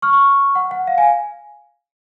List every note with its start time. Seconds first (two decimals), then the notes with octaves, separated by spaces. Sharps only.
0.02 C#6 F6
0.13 C#6 F6
0.55 F#5
0.71 F#5
0.87 F5
0.98 F5 G#5